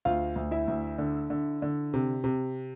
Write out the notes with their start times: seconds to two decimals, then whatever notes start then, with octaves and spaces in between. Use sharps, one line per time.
0.05 D2 F4 F5
0.36 D2
0.51 E4 E5
0.68 D2
0.98 D3
1.30 D3
1.62 D3
1.94 C3
2.24 C3